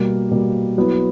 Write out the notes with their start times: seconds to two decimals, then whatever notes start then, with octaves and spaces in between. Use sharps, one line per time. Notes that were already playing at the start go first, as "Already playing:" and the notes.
Already playing: B2 G3 A#3
0.31 B2 G3 A#3
0.77 F#3 B3 E4